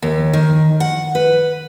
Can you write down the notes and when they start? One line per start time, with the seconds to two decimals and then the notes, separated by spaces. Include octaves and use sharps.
0.02 D#2
0.33 D#3
0.80 F#5
1.15 B4